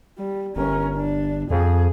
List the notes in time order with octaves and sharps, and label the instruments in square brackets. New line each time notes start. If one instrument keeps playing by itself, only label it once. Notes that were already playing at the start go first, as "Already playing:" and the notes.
[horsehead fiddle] G3
[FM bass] G1 [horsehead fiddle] C#4 A#4
[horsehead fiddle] D4
[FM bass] F2 [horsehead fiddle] G#4